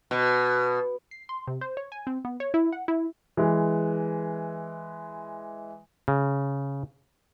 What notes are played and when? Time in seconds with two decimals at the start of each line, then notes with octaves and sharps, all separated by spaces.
0.11 B2
1.11 C7
1.29 C6
1.47 C3
1.61 C5
1.77 C#5
1.92 G#5
2.07 C4
2.25 B3
2.40 C#5
2.54 E4
2.72 F#5
2.88 E4
3.37 E3 G#3
6.08 C#3